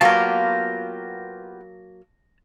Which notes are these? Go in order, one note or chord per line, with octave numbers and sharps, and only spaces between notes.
F#3 A#3 B3 F4 G4 F5 A5 A#5